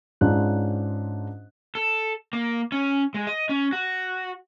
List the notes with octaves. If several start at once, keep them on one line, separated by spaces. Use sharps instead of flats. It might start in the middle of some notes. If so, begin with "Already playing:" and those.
G#2 C#4 D4 F4 F#6
A4
A#3
C#4
G#3
D#5
C#4
F#4